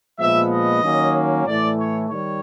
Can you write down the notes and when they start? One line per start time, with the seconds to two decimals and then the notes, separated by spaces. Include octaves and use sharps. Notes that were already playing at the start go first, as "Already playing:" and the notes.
0.18 A#2 F3 G#3 B3 E5
0.51 D#5
0.83 D#3 F#3 A#3 C#4
1.46 A2 E3 A3 D5
1.78 C#5
2.10 D#3 G3 C#5